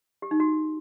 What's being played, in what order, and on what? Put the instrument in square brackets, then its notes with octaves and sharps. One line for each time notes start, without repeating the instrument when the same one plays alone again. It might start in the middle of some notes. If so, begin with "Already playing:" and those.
[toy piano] G4
D#4
F#4